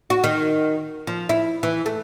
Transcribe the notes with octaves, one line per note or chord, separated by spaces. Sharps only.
F#4
D#3
F3
E4
E3
A3